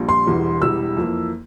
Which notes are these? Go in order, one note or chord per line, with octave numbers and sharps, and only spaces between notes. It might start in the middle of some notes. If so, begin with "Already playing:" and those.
Already playing: A#1 A#2 G3
C6
E1 E2 E3 G3
E1 E2 E3 G3 E6
F2 E3 A#3